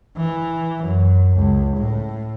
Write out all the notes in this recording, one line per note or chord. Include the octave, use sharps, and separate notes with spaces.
E3
F#2
C#2
A2